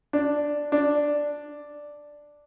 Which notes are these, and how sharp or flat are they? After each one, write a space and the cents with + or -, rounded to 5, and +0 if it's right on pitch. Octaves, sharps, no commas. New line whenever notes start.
D4 +0
D4 +0